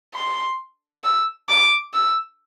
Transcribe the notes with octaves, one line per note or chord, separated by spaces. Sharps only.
C6
E6
D6
E6